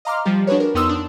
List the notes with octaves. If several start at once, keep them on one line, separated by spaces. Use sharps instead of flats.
D#5 F5 A#5 C6 D6 F6
F3 G3 G4
D4 F#4 G#4 B4 C#5
A#4
F2 B3 D#4 C6 D#6 E6
D4